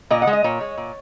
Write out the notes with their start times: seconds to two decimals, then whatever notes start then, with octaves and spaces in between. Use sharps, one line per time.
0.10 A#2 D#5
0.22 F#5
0.27 G#3
0.33 D#5
0.44 A#2 C#5
0.61 G#3
0.77 A#2